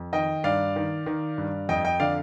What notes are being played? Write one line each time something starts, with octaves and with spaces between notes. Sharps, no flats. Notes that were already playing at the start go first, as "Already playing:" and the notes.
Already playing: F2
D#3 D#5 G5
G2 D5 F5
D#3
D#3
G2
F2 D#5 G5
D#5 G5
D3 D5 F5